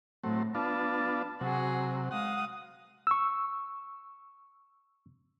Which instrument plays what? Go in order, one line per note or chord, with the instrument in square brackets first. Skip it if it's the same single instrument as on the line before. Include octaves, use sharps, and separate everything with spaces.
[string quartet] A2 [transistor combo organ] F#3 A3 C4
[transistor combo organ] B3 D4 F4 [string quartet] A5
[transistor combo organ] C3 F#3 [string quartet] F#4 G#4
[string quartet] G#3 F5 D#6 [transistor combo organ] F#5
[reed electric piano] C#6 E6